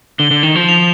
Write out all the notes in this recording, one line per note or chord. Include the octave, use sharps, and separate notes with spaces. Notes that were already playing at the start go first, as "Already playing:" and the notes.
D3 G7
D3
D#3
F3
F7